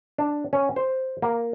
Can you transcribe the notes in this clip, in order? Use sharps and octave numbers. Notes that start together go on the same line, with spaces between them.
D4
C#4
C5
A#3